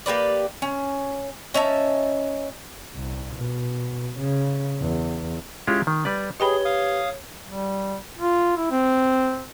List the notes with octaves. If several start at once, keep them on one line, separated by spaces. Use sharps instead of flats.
A#3 G4 B4 D5
C#4
C#4 D#4 E5 A5
C2
B2
C#3
E2
G#3 C#4 E4 F4 G4 G#4
D#3
G3 B4 D5
G4 G#4 B4 C#5 D#5 G5 B5 G7
F5 D#6
G3
F4
E4
C4